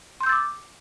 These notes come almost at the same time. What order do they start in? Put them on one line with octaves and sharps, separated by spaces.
C6 G6 E6 A6 D6